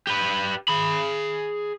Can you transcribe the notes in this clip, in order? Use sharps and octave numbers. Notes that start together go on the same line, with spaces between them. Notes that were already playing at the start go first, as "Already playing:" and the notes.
G4 B4
G#4 B5